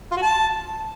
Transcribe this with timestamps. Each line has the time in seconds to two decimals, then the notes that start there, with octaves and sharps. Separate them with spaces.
0.12 F4
0.17 F#4
0.22 A5